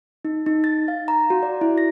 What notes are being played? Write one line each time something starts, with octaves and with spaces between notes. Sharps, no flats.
D#4
D#4
A6
F5
A#5
F#4
D5
E4
A#6